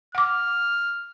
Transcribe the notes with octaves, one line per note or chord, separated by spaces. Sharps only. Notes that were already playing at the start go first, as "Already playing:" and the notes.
F#5 D6 F6